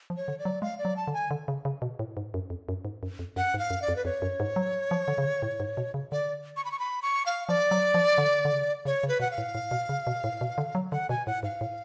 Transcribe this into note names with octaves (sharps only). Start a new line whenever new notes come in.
F3
C#5
D3
D5
F#3
G#3 F5
D5
F#3
A5
D3
G#5
D3
C#3
C#3
B2
A2
G#2
F#2
F2
F#2
G#2
F#2
F2
F#2 F#5
G#2
F5
F#2
D5
F2
B4
F2 C#5
F#2
G#2
F#3
F3
D3
C#3
D3
A2
G#2
B2
C#3
D3 D5
C#6
B5
C#6
B5
C#6
F5
F3 D5
F#3
F3
D3
D3
C#3
C#3 C#5
C#3
B4
B2 F#5
F5
A2
A2
B2
C#3
B2
A2
B2
D3
F#3
D3 F#5
B2 G#5
A2 F#5
G#2 F5
A2